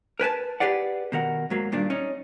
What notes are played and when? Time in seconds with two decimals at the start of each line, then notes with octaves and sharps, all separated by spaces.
0.19 A#4 B4 G#5 A5
0.60 G4 G#4 B4 D5 F#5
1.12 B2 D#3 A#4 F#5
1.50 G#2 F#3 A#3
1.72 G2 A#2 D#3 D4
1.90 C#4 D#4